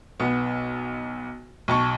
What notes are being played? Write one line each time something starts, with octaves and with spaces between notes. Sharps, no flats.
B1 B3
B1 A5 C#6